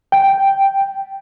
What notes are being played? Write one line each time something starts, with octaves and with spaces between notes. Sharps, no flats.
G5